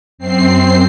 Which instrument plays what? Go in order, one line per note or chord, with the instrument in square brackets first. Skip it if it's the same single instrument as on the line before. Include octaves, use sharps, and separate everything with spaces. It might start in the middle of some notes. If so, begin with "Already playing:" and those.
[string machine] F#2 C4 C7